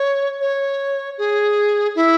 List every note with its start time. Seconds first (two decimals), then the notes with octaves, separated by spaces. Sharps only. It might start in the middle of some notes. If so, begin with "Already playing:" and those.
Already playing: C#5
0.40 C#5
1.18 G#4
1.95 E4